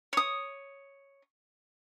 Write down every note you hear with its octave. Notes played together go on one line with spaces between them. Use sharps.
C#5 D#6